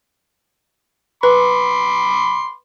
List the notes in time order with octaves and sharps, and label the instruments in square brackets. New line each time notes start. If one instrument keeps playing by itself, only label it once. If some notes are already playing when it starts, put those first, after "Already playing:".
[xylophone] B4 [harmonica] B5 C6 D6